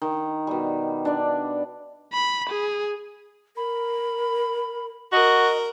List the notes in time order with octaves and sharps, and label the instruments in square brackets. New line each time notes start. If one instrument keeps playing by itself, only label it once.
[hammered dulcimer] D#3
B2 G3
D4 D5
[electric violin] B5
G#4
[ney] A#4 [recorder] B5
[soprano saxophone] F#4 [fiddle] A#4 [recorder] D#5